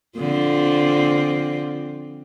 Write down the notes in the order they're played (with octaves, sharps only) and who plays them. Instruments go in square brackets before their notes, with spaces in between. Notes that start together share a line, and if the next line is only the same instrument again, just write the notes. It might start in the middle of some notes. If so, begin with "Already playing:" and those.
[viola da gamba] D3 F3 C4